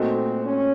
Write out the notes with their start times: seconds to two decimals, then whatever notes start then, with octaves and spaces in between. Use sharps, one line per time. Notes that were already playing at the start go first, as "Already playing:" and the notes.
Already playing: A#2 A3 C4 D#4 F#4
0.44 C#4